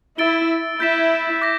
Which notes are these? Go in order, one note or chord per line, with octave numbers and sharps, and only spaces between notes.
E4 E6 A6 D7 G7
E4 G6 B6 E7
D6 G6 A#6